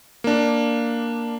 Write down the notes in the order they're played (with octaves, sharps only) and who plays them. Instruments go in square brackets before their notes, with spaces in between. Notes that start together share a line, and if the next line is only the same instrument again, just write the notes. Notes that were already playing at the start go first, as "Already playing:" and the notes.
[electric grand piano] A#3 D4